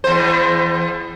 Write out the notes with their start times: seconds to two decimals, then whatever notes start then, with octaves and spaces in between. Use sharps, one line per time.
0.04 E2 C5